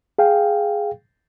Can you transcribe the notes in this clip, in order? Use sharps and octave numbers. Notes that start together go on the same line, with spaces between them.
G#4 F5 G5